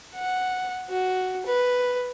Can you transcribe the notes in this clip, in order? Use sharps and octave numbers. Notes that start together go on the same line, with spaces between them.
F#5
F#4
B4